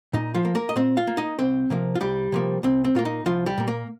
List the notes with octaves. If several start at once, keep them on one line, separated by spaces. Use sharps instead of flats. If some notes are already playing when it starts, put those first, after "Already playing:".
A#2 D#4
F3 F4
A#3
A#3 A#4
D#5
A#2 C4 C5
F4 F5
A#3
D#4 D#5
C2 C4 C5
C3 F3 A#3
F4
C2 G3 G4
C3 F3 A#3
C2 C4
C4
A#2 A#3 F4
D#4
C2 F3 F4
G3 G4
A#2 A#3
A#3 A#4